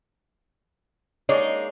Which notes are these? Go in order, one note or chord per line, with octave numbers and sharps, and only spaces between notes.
G#3 A#3 D#4 C#5 D5